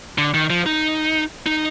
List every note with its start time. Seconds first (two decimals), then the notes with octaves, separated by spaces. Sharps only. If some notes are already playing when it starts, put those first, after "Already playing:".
0.18 D3
0.34 D#3
0.50 F3
0.66 D#4
1.46 D#4